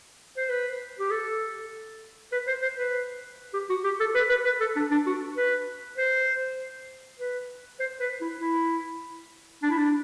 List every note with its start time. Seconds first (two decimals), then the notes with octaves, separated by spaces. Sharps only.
0.37 C5
0.49 B4
0.99 G4
1.11 A4
2.32 B4
2.47 C5
2.62 C5
2.78 B4
3.53 G4
3.69 F#4
3.84 G4
4.00 A4
4.15 B4
4.30 B4
4.45 B4
4.60 A4
4.76 D4
4.91 D4
5.06 F#4
5.36 B4
5.97 C5
7.19 B4
7.80 C5
8.00 B4
8.21 E4
8.41 E4
9.63 D4
9.70 E4
9.77 D4